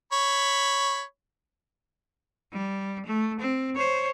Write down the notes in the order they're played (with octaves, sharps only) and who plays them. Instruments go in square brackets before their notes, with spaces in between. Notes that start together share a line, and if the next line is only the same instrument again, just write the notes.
[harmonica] C#5 B5
[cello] G3
A3
C4
C5 C#5